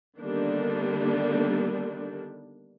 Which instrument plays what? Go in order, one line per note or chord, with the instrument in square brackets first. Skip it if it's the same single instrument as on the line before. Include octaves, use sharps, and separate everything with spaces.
[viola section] D3 D#3 G3 A#3 B3 D4